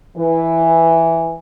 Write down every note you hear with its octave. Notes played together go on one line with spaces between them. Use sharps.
E3